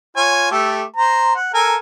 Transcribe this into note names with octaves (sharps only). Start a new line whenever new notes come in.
F4 C#5 G#5
A3 G4 A4
C5 A#5
F#5
A4 A#4 G#5